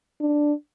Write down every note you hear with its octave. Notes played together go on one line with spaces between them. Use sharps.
D4